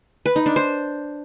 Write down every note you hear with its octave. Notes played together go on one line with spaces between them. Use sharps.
B4
D#4
D4
C5